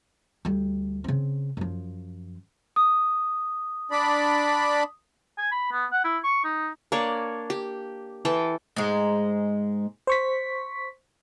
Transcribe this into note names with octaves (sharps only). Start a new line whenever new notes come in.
D2 G3
C#3 C4
F#2 F3
D#6
D4 D5 B5
G#5
B5
B3
F#5
E4
C#6
D#4
A#3 D4 C#5 D5
G4
E3 A4 G5 A5
G#2 G#3
C5 C#6 B6